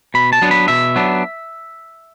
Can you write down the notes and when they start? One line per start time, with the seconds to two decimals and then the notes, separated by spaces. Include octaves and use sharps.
0.14 B2 B5
0.33 A5
0.41 F#3 B3 D4
0.51 B5
0.68 B2 E5
0.96 F#3 B3 D4